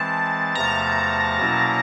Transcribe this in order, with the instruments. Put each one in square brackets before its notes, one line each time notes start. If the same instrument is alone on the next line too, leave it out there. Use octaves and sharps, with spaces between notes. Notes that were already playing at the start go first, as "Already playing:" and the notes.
Already playing: [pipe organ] E3 G#3 C4 [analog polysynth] A5
[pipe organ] E2 C3 F3 A3 [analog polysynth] A#5
[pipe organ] B2 F#3 A#3 C#4 E4